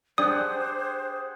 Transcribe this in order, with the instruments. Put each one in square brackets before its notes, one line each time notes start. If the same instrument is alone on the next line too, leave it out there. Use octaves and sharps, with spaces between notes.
[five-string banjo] D4 [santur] G4 G#4 F#5 [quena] C5 [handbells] D#6